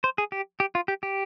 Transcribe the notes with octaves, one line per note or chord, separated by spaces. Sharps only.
C5
G#4
G4
G4
F4
G4
G4